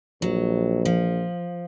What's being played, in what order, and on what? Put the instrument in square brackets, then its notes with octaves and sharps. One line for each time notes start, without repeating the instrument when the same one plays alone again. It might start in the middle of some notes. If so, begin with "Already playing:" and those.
[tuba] A#1 [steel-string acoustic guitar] F#3
[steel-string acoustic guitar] F3